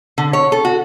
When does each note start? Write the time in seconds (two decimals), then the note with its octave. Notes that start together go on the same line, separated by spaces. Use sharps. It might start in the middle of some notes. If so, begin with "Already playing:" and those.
0.18 D3
0.33 C#5
0.52 A4
0.65 F#4